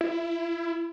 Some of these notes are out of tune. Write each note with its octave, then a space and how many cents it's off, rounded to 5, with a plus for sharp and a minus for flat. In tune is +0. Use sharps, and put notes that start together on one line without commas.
E4 +25